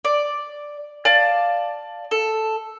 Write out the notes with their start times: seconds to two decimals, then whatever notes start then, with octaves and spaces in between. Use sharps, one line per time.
0.05 D5
1.05 D5 F5 A5
2.11 A4